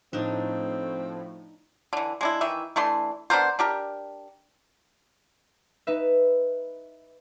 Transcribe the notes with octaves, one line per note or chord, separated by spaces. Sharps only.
A2 F3 C4 D4 D#4
D3 E3
G#3 D4 E4
D#3 E3 E5
E3 A3 D4 C6
B3 D4 A#4 C5
D4 G4 A#4
D#4 B4 E5